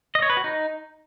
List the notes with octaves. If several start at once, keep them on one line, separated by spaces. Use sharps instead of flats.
D#5
C#5
B4
F#4
D#4